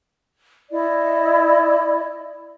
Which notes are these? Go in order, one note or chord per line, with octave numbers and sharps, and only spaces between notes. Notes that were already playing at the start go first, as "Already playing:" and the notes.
E4 D5 D#5